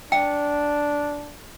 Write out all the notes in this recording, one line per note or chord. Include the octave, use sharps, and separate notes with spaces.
D4 G5